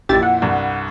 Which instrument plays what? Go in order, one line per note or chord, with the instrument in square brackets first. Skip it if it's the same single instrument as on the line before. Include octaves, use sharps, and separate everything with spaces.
[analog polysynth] A1 G4 A6 [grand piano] F2 A#2 E4
[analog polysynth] F#5
[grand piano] C2 G2